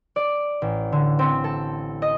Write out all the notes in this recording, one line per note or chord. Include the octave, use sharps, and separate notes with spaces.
D5
A1
D3
C4
A4
D#5